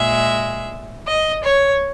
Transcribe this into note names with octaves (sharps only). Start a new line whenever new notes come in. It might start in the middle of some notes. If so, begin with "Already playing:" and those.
Already playing: A#2 G#3 E5
D#5
C#5